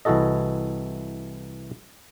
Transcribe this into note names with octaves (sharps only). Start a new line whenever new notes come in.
C2 E3 E4 F#4 A4 D#5